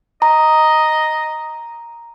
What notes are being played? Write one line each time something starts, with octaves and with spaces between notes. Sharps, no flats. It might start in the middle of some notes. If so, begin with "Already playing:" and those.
D#5 A#5